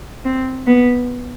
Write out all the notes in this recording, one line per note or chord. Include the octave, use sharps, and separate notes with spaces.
C4
B3